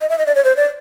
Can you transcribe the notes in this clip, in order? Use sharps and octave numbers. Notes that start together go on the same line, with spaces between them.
D#5
E5
D#5
D5
C#5
C5
D5